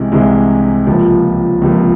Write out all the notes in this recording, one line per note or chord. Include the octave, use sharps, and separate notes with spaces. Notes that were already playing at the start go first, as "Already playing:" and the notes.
Already playing: C2 C3 E3 G#3
C2 C3 E3 G#3
C#2 C3 F3 A#3
C#2 C3 F3 A#3